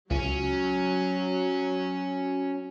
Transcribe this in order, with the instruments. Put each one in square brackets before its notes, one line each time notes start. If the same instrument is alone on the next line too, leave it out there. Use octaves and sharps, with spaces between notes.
[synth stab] C#2 [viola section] F#3 [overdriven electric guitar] C#4